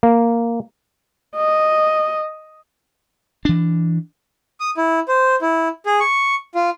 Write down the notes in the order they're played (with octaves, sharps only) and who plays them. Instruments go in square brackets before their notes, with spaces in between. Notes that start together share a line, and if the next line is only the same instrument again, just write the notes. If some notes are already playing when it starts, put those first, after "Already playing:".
[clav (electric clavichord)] A#3
[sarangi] D#5
[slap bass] E3 D4
[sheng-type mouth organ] D#6
E4
C5
E4
G#4
C#6
F4